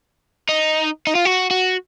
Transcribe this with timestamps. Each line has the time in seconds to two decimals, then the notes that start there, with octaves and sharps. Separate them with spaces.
0.49 D#4
1.07 D#4
1.15 F4
1.25 F#4
1.51 F#4